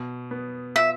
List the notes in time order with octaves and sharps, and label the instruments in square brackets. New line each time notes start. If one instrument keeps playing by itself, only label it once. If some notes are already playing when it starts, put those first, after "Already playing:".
Already playing: [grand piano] B2
B3
[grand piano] F4 [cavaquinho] E5